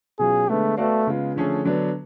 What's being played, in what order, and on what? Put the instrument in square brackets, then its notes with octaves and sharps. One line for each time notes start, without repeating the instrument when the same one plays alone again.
[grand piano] B2 F#3 C#4 F4 [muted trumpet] G#4
[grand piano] D3 G#3 B3 [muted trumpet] A3
[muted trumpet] A3 [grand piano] B3 F#4 A4 D5 F5
[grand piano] C#3 G#3 B3 F4
D3 F3 A3 C#4 G#4
D3 F#3 B3 D4